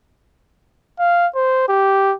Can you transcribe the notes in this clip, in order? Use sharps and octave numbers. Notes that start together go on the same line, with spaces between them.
F5
C5
G4